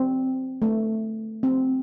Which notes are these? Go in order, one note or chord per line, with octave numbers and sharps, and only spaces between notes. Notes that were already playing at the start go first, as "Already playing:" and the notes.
Already playing: C4
A3
C4